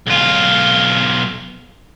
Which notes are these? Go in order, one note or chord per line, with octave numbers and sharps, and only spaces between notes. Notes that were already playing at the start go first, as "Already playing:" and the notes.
B1 F4